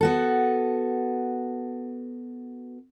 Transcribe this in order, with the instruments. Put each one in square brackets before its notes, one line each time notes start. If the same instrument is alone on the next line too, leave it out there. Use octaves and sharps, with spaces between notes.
[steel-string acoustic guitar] B3 F#4 A4